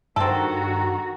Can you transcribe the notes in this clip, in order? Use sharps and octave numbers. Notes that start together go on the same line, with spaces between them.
G2 D#3 C4 F#4 A4 A#5